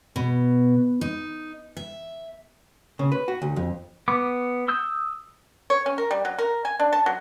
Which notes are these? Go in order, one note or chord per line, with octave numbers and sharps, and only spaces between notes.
B2
D#4
E5
C#3
B4
F#4
D2
F2
B3 D6
D#6 E6 G6
C#5
C#4
A#4
G3
F#3
A#4
G#5
D4
A5
F#3